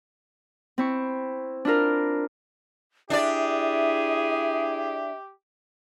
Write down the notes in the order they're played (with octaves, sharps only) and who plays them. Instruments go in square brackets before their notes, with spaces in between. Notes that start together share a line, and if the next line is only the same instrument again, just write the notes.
[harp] C4 E4 C#6
D4 E4 F4 A#4
[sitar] D4 D5 [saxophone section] E4 G#4 [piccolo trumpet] G4 [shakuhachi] E5